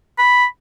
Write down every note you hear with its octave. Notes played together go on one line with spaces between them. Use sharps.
B5